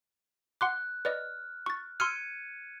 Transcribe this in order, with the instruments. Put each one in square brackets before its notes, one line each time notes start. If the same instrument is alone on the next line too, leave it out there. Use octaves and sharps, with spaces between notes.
[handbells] F#5 C6 D6 [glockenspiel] F#6
[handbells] B4 D5 D#5 [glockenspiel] F6
[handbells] C#6 A6
[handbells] C6 E6 F6 [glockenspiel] G#6 C#7 D#7